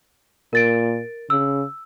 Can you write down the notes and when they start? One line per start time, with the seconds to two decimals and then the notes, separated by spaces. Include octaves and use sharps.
0.53 A#2 A#4 A6 D7
1.30 C#3 E6